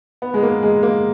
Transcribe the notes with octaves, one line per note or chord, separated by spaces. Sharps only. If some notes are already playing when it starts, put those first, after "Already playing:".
B3
G#3
A#3
G#3
A#3